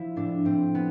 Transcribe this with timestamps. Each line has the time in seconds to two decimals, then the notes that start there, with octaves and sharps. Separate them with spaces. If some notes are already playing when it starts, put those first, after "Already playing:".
Already playing: F3 E4
0.16 A2 D4
0.45 A2 C4
0.75 B3